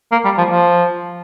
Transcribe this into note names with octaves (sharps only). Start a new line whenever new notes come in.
A#3
G3
F3
F3